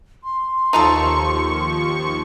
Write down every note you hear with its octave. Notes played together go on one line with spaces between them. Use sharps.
C6
D#2 F3 D#4 F4 A4 C#6